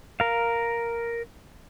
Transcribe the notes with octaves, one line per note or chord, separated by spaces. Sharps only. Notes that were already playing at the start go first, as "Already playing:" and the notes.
A#4 F5